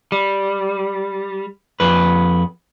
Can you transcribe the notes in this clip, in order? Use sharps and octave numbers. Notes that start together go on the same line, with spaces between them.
G3
F2 B4